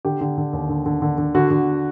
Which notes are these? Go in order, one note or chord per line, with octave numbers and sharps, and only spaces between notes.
D3 G4
D3
D3
D#2
D3
D3
D3
D3
D3 F#4
D3